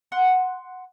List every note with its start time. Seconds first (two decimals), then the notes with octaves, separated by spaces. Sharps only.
0.12 F#5 C6 F#6